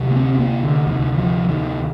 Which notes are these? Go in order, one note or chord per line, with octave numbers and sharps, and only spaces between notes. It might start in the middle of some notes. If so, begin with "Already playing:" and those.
Already playing: D2 C3
A#3
C4
C4
A#3
D3
D2 C3 D#3
F3
D#3